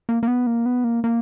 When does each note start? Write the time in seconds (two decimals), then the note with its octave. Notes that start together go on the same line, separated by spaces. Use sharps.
0.09 A#3
0.23 A#3
0.28 B3
0.47 A#3
0.66 B3
0.84 A#3
1.04 A#3